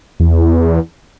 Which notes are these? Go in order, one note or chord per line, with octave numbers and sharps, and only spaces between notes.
E2